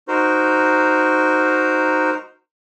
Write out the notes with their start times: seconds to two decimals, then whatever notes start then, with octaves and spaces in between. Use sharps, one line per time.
0.08 D#4 F#4 A#4 C5